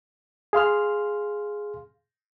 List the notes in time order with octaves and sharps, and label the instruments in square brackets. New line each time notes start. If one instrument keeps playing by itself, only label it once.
[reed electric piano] G#4 F5 C6 F6